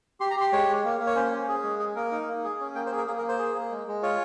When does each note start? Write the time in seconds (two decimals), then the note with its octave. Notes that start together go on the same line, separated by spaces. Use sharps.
0.20 G4 C6
0.31 A#5
0.36 G4 C6
0.52 G#3 C#5
0.69 G#3
0.85 A#3
1.00 A#3
1.06 C#5
1.15 C#4 C5
1.32 C#4
1.48 G#4
1.63 G#3
1.79 G#4
1.95 A#3 A#4
2.11 D#4
2.28 A#3
2.44 G#4
2.60 C#4
2.75 A#3 G5
2.86 C5
2.92 G#4
2.97 A#4
3.07 A#3 G#4
3.18 A#4
3.23 A#3
3.28 C5
3.38 G#4
3.54 A#3
3.70 G#3
3.87 G#3
4.03 F4 C#5